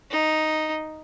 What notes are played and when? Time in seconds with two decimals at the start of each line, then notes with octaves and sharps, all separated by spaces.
0.11 D#4